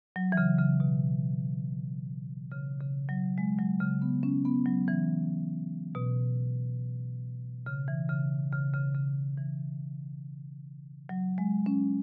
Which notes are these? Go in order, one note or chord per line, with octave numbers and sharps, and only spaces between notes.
F#3
E3
C#3
C#3
B2
C#3
C#3
F#3
G#3
F#3
C#3
B3
C#4
B3
F#3
E3
B2
C#3
E3
C#3
C#3
C#3
C#3
E3
F#3
G#3
C#4